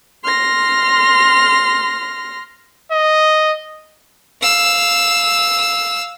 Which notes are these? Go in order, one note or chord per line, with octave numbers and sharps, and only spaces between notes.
C6 F6 A#6
D#5
F5 E6